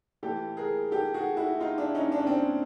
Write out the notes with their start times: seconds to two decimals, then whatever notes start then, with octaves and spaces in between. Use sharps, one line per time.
0.23 A2 E3 G4 A4
0.57 G#4 A#4
0.91 G4 A4
1.14 F#4 G#4
1.37 E4 F#4
1.60 D#4 F4
1.78 D4 E4
1.95 C#4 D#4
2.12 D4
2.19 C#4
2.27 C4 D4